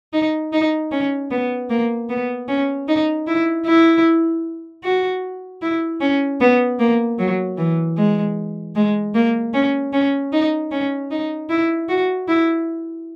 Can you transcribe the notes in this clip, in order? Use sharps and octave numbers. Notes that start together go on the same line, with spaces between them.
D#4
D#4
C#4
B3
A#3
B3
C#4
D#4
E4
E4
F#4
E4
C#4
B3
A#3
F#3
E3
G#3
G#3
A#3
C#4
C#4
D#4
C#4
D#4
E4
F#4
E4